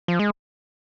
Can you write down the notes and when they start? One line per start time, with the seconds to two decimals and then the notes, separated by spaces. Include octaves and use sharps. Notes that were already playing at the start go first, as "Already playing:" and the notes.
0.08 F3
0.19 G#3